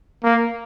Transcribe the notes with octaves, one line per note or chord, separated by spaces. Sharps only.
A#3